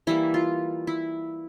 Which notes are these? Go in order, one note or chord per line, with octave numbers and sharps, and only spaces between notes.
E3 G3 A#3 E4
F4
E4